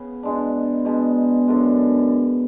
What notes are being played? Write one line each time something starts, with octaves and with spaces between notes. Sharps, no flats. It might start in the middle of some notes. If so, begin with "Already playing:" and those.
Already playing: C#3 B3
B2 G#3 D4
B2 G#3 D4
F#2 D3 G#3 D4